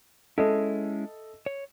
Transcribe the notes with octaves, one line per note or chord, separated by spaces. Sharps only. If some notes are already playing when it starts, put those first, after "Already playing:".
G#3 C#4 E4 A4 D#5 E5
C#5